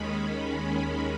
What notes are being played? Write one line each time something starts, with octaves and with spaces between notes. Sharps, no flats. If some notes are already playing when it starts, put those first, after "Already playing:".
Already playing: D#2 D#3 G#3 C#4 B5